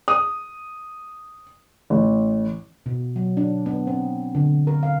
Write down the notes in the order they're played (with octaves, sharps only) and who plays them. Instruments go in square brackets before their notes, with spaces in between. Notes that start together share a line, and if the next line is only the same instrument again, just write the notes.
[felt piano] D#6
A1
[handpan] B2
F#3
D4
B3
C4
D3
A#4
F5